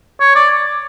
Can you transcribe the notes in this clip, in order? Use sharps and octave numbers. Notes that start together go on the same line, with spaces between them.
C#5
D5